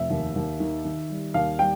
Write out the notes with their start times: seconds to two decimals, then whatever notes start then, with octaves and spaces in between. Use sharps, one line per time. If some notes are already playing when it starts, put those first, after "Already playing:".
Already playing: F1 E5
0.10 D#2
0.36 D#2
0.60 D#3
0.85 D#3
1.10 G3
1.34 D#2 F5
1.59 G3 G5